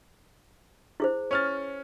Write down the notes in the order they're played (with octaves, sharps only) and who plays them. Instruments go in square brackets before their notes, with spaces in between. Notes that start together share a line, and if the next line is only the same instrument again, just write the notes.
[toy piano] E4 G#4 C5
[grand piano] C#4 F6 A6